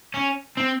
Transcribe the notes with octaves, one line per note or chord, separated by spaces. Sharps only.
C#4
C4